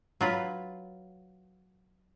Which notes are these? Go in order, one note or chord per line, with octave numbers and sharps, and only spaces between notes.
F#3 F4 B4